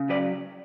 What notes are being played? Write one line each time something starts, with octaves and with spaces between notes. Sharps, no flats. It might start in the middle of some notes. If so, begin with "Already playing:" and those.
Already playing: C#3
F#3 B4 D5